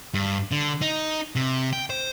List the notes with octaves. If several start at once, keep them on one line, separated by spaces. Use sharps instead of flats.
G2
D3
D#4
C3
G5
C5